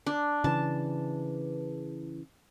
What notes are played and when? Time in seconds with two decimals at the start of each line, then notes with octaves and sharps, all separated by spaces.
0.06 D4
0.44 C#3 E3 A5